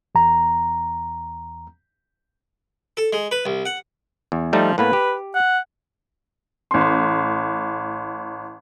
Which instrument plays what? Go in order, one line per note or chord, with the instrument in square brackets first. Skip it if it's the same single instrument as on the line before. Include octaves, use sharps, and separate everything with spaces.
[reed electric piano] E2 A#5
[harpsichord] A4
G#3
B4
C2
F#5
[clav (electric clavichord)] E2
[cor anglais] F3 [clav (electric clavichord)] G3 A3 D#4
[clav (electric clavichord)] A2 A#3 B3 [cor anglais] B4
[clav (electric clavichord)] G4
[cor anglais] F#5
[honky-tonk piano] A1 C6